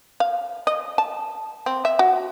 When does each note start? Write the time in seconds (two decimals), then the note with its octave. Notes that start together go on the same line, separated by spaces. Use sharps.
0.20 F5
0.67 D#5
0.98 A5
1.66 C4
1.85 E5
1.99 F#4